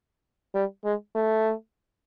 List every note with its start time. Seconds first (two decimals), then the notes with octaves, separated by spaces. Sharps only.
0.54 G3
0.84 G#3
1.15 A3